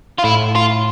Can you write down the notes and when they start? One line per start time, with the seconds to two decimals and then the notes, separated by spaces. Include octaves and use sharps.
0.18 F4
0.24 A2 E4
0.55 F4